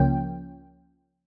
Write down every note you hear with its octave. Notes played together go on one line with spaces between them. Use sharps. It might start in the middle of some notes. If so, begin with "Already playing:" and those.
Already playing: C#2 C#3 F3 A#3 C#4 G5